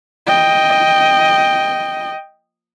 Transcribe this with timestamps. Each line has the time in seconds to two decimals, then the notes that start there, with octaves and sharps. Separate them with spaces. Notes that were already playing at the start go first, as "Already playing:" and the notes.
0.27 D#5 G5